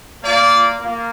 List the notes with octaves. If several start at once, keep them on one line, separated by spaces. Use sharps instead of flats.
A#3 F4 D5
A#3 F4